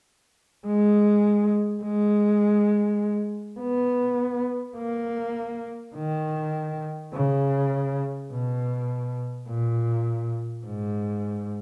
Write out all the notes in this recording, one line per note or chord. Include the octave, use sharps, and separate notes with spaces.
G#3
G#3
B3
A#3
D#3
C#3
B2
A#2
G#2